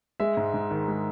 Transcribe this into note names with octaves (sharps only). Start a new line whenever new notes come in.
G#3 E5
G#2
G#2
D#3
G#3